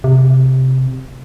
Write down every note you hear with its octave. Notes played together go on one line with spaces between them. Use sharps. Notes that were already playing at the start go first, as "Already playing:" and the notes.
C3